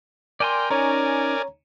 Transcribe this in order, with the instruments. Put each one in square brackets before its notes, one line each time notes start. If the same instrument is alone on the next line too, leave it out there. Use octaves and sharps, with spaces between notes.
[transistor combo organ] A#4 G5 [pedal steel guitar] D5 G#5 C6
[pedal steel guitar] C#4 D#4 [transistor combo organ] A#4 D5 G#5 [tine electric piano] C#5 A#5